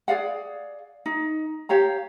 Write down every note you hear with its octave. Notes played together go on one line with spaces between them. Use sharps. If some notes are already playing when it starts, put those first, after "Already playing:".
G#4 D5 F5 F#5
D#4
G4 C#5 F5 A#5